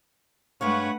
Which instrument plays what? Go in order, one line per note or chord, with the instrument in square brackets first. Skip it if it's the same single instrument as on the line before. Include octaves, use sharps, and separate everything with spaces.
[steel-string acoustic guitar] G2 G#3 F5 [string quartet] A3 B4 F#5 [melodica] C#5 C#6